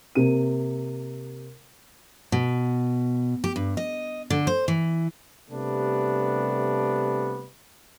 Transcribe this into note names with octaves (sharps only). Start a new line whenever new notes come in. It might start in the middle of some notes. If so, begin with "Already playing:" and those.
C3 A#3 D#7
B2
G4
G2
D#5
D3
C5
E3
C3 G3 A3 B3 D4